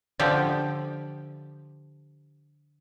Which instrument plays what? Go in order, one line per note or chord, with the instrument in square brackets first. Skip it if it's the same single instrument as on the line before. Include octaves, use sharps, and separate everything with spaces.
[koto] D3 F3 G4